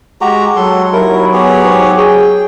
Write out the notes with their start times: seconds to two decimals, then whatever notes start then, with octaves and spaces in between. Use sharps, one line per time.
0.21 G#3 F#4 G4 A#5
0.56 F#3 A4 C6
0.93 D#2 F#3 E4 A#4
1.33 B3 G4 G#4 C#5
1.64 G#2
1.97 G#4 G5